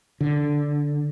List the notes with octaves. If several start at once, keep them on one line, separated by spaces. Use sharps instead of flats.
D3